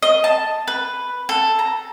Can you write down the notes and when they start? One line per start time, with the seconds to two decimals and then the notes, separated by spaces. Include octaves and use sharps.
0.03 D#5
0.24 A5
0.68 B4
1.29 A4
1.59 A#5